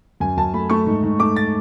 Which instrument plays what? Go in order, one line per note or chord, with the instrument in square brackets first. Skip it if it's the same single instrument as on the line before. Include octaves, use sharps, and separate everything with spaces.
[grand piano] F#2 G#5
F#2 A5
A3 B5
A3 C#6
G#2
G#2
A3 D6
A6